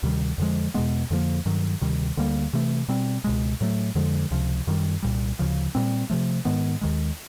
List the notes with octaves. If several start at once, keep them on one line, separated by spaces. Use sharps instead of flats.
D2 C3 D#3 G3
F2 D3 F3 G#3
E2 B2 G#3 B3
F2 D3 F3 A#3
G2 D#3 F#3
D2 C3 D#3 G3
D2 D3 G3 A#3
C3 E3 A3
B2 G3 C4
C#2 B2 G#3
A2 F#3 A3
F2 D3 F3 G#3
C#2 C3 F3
F#2 D#3 G3
C2 A#2 G3
D2 C#3 F3
A#2 G3 C4
C3 F3 A3
G#2 D#3 G#3 B3
D#2 D#3 G#3